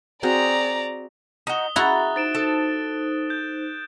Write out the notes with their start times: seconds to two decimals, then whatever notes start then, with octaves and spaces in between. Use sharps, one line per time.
0.23 C4 F#4 G#4 D5 A#5
1.47 D#4 F#4 D#6 G7
1.76 E4 F#4 G#4 E5 A#5 F#6 A6
2.16 D#4 C5 A6 D7 E7
2.35 A4
3.30 G6